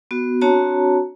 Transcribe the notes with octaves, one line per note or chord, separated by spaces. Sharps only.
B3 F#4
C4 D4 F#4 C#5 A5 A#5